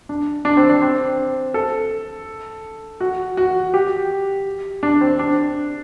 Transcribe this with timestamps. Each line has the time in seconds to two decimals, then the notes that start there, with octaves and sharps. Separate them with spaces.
0.09 D4
0.45 D4
0.57 C4
0.69 D4
0.82 C4
1.54 A4
3.00 F#4
3.37 F#4
3.74 G4
4.83 D4
5.01 C4
5.19 D4